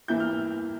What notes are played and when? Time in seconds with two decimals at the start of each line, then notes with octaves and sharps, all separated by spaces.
0.08 E3 A#3 E4 G6
0.20 F6